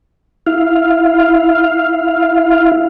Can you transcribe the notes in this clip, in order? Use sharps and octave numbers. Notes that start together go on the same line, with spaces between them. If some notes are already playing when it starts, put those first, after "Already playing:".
E4 F5